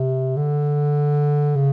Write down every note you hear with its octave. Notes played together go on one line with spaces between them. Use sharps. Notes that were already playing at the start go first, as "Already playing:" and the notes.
Already playing: C3
D3
C#3